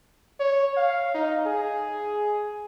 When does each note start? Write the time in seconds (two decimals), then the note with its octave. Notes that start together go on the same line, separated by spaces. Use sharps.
0.40 C#5
0.77 F5
1.14 D#4
1.46 G#4